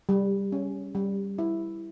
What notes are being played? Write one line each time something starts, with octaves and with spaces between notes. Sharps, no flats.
G3
C#4
G3
E4